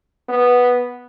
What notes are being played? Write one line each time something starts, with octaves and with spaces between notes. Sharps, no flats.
B3